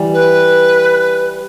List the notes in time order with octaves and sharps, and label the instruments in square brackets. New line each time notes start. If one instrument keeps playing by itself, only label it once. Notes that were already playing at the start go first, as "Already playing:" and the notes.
Already playing: [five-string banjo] E3 G3
[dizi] B4